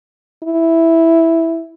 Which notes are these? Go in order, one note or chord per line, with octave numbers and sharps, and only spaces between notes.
E4